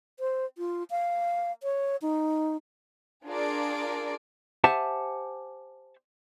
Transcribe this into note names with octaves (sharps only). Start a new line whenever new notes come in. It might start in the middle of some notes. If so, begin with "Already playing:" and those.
C5
F4
F5
C#5
D#4
D4 F4 G#4 A#4 D5
G4 C5 E5 F#5 G#5 A5